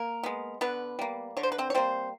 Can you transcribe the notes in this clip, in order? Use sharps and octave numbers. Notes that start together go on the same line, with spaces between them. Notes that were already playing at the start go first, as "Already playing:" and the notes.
Already playing: A#3 A#4
G#3 B3
D3 B3 B4
G3 A#3
D3 C#5
C5
B4
C4 C5
C#5
G3 A#3 C4 C5